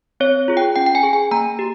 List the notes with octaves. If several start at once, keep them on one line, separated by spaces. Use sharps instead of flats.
C4 C#5
F4 G#4
G5
C#4 G5
G5
G#5
G#4
G#5
A#3 A#5
G4